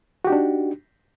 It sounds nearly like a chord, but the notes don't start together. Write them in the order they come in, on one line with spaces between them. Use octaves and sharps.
F#4 G4 D#4 D4